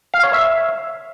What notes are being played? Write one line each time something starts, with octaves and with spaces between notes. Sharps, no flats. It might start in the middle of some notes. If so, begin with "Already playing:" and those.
F5
C#5
E5